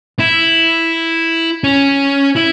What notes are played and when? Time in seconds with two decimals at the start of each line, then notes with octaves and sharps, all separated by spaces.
0.19 E4
1.64 C#4
2.36 E4